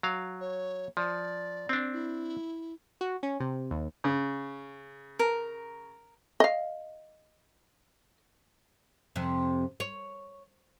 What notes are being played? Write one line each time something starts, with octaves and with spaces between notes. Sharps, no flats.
F#3 F5
C#5
F3 D5
C4 D4
E4
F#4
C#4
C3
D#2
C#3
A#4
D#5 F5
F2 C3
C#5